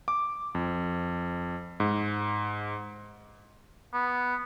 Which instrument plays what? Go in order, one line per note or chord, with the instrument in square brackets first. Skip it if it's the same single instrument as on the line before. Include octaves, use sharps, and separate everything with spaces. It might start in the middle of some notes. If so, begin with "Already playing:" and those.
[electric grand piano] D6
F2
G#2
[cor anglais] B3